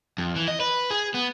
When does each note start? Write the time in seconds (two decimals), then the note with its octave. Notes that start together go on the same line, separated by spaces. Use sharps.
0.18 F2
0.36 E3
0.48 D#5
0.60 B4
0.91 G#4
1.14 B3